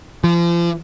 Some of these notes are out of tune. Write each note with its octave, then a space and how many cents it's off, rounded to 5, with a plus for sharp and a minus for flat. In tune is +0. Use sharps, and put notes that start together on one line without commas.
F3 -35